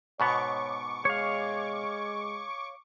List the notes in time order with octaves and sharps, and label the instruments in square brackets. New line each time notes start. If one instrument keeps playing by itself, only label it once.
[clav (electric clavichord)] G#2 B2 B3 [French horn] C#5 [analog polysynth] C#6 D6
[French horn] G#3 [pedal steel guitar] C#5 F5